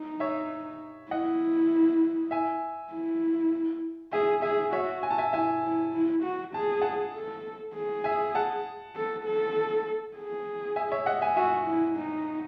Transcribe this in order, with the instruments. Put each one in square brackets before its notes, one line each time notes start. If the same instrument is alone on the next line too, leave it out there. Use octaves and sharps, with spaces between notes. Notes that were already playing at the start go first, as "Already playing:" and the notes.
Already playing: [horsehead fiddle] D#4
[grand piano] C#5 E5
[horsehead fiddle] E4 [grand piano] D#5 F#5
[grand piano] E5 G#5
[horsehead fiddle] E4
[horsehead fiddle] G#4 [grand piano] E5 G#5
[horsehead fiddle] G#4 [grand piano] E5 G#5
[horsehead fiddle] F#4 [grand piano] C#5 E5
[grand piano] G#5
A5
E5 G#5
[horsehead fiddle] E4 [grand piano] E5 G#5
[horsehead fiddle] E4
E4
F#4
[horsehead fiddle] G#4 [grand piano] A5
[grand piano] F#5 A5
[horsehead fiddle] A4
G#4
[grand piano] E5 G#5
F#5 A5
[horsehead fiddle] A4
A4
G#4
[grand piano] E5 G#5
C#5 E5
D#5 F#5
E5 G#5
[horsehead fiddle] F#4 [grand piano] E5 G#5
[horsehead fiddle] E4
D#4